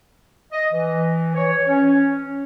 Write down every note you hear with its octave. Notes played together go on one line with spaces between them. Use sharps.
D#5
E3
C#5
C#4